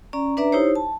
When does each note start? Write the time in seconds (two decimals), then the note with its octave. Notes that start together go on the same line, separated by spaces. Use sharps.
0.13 C#4 D5 A#5
0.37 D4 B4 D5 E5 A#5
0.52 D#4 E4 G4 C5 C#5
0.75 A5